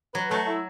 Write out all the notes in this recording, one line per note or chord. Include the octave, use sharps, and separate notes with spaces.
F#3 B4
F#3 A3
E4